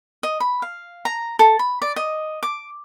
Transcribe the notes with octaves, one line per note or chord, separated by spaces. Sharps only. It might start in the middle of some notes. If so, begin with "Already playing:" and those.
D#5
B5
F5
A#5
A4
B5
D5
D#5
D6